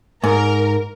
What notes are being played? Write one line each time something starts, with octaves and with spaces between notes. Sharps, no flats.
G#2 A#4